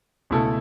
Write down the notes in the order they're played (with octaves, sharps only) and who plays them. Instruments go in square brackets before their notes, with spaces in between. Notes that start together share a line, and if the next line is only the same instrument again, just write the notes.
[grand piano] C#2 B2 A3 E4 A4